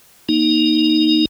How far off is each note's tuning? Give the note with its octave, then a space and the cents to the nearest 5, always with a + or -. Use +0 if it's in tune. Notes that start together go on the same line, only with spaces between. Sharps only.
A#3 +20 D#4 +0